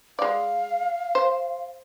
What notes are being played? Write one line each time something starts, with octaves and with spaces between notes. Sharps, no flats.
G#3 D5 F5
C5